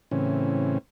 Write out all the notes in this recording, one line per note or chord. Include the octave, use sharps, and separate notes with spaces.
A2 C#3 E3 C4 C#4